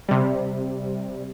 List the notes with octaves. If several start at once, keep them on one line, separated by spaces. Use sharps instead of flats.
C3 G3